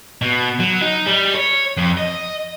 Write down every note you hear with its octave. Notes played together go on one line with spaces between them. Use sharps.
B2
F#3
D#4
G3
C#5
F2
D#5